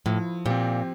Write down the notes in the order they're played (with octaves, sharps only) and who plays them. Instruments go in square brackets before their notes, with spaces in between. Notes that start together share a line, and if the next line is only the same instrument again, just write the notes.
[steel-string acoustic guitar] A2 [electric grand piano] F3
[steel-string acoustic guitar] A#2 [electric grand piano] C4 G4